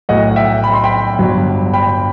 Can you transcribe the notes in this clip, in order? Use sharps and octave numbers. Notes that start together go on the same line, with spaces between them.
B1 A2 F#3 D#5 F#5
E5 G5
B5
C6
G5 B5
G1 G2 F#3
G5 B5